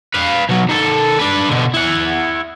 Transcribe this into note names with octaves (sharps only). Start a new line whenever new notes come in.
B4 F5
B2 F#3
D#3 A4
D4 B4
B2 D3
E4 F#5